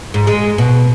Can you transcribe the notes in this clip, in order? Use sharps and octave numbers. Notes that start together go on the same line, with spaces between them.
G#2
G#3
B2